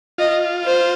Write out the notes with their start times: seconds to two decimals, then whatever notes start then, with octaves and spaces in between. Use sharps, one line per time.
0.18 F4 D#5
0.64 C5